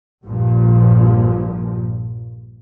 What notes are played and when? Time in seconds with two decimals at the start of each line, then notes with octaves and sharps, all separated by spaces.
0.25 A#1 G2 A#2 F3